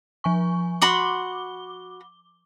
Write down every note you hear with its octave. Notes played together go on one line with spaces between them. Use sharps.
F3 G#5 C#6
F#4 B5 C6 D6 G7